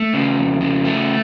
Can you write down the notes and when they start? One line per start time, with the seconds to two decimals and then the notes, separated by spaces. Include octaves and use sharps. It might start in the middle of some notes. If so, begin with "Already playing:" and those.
Already playing: A3
0.14 C#3
0.37 F2
0.61 C#3
0.85 A3